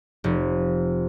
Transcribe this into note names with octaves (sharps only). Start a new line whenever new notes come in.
F1